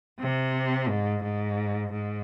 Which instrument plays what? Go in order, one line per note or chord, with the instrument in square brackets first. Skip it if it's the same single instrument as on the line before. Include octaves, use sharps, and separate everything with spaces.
[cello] C3
G#2
G#2
G#2